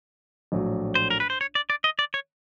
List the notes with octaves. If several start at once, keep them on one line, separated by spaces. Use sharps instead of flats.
A#1 A2 F#3 A3
C5
A#4
B4
C5
C#5
D5
D5
D#5
D5
C#5